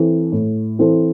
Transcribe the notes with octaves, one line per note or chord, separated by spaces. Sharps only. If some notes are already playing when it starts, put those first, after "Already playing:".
Already playing: E3 C4 E4 A4
A2
E3 C4 E4 A4